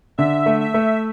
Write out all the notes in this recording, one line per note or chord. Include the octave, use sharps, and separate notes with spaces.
D3 E5
A3
E5
A3